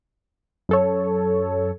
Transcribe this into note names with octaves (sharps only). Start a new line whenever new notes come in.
F#2 A4 C#5